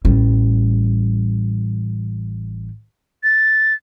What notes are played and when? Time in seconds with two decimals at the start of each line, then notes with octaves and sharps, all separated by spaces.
0.05 A1 G3
3.24 A6